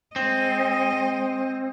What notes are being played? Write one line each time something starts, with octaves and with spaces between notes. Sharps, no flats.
G#3 C4 D#5